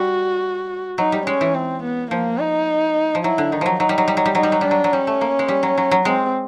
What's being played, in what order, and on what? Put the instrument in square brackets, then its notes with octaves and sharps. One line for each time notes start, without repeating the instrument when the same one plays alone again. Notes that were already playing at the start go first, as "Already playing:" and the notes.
Already playing: [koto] G3 [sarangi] F#4
[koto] F#3 [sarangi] D#4
[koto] G3
[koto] G#3 [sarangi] C#4
[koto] E3
[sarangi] C4
B3
[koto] F3 [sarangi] A#3
[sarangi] D#4
[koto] F3
[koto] F#3 [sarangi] E4
[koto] D3
[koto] D#3 [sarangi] D#4
[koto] F3 F#3
[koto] F#3 [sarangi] D#4
[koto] G3
F#3
G3
F#3
G3
[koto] F#3 [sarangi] D#4
[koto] G3
F#3
[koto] G3 [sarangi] D4
[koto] F#3
F#3
[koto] G3 [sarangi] C#4
[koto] A3
A#3
G#3
G3
F#3
F#3
F#3
[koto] G#3 [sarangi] C4